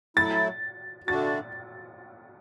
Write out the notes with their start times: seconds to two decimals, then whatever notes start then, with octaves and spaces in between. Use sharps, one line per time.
0.17 F#3 A3 E4 A6
1.07 D3 A3 D4 F#4 A6